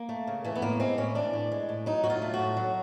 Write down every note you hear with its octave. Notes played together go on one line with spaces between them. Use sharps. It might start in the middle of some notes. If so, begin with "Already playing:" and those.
Already playing: A#3
A3
C#3
E3 A3
B3
A2 A#3
G#3 C4
A2 C#4
E3 D4
A2
G#3
A2
F#3 D#4
A2 F#4
F4
A3
F#4
A2
F#3